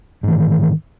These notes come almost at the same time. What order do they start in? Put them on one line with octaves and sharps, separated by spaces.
G#2 E3 D#3